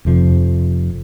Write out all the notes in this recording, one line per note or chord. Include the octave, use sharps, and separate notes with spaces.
F1 F2 C3 F3